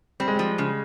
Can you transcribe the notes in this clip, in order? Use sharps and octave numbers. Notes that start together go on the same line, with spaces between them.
G3 C4
G#3
F3 G3
C#3